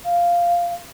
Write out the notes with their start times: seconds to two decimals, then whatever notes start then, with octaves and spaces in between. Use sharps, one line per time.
0.04 F5